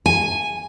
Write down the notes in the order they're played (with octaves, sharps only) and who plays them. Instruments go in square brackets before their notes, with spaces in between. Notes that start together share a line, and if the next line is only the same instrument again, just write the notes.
[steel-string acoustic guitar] G#5